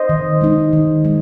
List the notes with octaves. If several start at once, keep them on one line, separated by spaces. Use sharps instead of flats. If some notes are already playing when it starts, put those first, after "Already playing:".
Already playing: C5 D#5
D#3
G#3 D#4
D#3
G#3